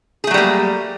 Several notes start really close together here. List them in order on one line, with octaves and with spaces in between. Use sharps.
G#4 A3 F#3 G3 A#3